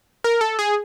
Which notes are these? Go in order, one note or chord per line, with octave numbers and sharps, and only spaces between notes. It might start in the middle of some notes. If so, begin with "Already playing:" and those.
A#4
A4
G#4